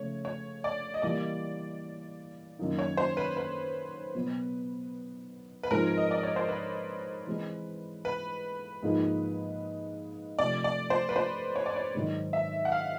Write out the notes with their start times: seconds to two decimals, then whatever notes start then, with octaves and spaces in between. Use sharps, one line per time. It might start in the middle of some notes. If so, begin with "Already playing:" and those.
Already playing: C#3 F3 A3 C#5
0.25 C#5
0.64 D5
0.94 D#5
1.02 E3 G3 A#3 D5
2.59 F#2 D#3 F#3 A#3 D#4
2.79 C#5
2.97 C5
3.17 B4
3.37 B4
4.14 B2 F#3 B3
5.63 B4
5.71 G#2 F3 G#3 C4 D#4 A#4
5.97 D#5
6.11 D5
6.23 C#5
6.36 C5
6.49 B4
7.27 E3 G#3 C4
8.05 B4
8.83 G#2 F3 A#3 D#4 G#4
10.39 C3 F3 A3 D5
10.64 D5
10.90 C5
11.09 B4
11.16 C5
11.56 C#5
11.66 D5
11.76 C#5
11.95 G#2 D#3 F#3
12.33 E5
12.65 F#5
12.72 F5